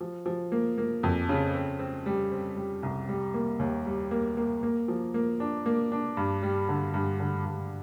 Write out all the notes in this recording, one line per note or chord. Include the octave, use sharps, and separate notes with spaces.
F3
F3
A#3
A#3
F2
C#3
C4
C4
G3
C4
G3
C2
G3
A#3
D#2
G3
A#3
A#3
A#3
F3
A#3
D4
A#3
D4
G2
G3
D3
G2
D3
G2